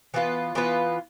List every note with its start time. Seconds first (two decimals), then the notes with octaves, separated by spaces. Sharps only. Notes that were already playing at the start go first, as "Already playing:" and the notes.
0.14 E3 B3 F4 B4
0.55 E3 B3 F4 B4